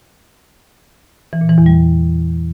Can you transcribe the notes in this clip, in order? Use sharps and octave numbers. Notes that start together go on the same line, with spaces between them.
E3
A#2
E3
E2
G3